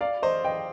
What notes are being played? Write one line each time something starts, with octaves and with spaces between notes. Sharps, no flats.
D5 F5
C5 D#5
D#5 G5